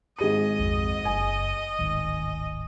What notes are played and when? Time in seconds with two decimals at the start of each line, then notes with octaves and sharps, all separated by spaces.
0.19 G#1 G#4 D#5 D#7
0.59 A#1 F2
1.05 F#1 G#5
1.79 D1 G#1 D#3